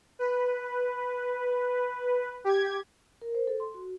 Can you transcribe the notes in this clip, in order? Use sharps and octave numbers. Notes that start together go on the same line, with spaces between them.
B4
G4 G#6
A#4
C5
A4
C6
F#4